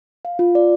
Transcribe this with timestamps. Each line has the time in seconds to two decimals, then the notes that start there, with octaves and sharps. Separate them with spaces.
0.25 F5
0.39 F4
0.55 D5